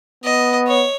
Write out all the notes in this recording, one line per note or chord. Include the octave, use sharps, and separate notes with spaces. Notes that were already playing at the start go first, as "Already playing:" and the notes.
B3 D#5
C#5